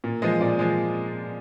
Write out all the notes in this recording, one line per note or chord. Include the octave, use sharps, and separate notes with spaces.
A#2
F3 G#3 D#5
A#2 D5
F3 G#3